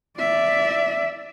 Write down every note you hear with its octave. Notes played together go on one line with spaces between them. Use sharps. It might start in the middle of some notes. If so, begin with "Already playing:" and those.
D5 E5